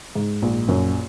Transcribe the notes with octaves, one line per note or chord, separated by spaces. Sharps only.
G#2
A#1
F#2